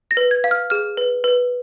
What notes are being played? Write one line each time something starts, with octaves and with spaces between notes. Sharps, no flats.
A#6
B4
G#6
F5
F6
G#4 F6
B4
B4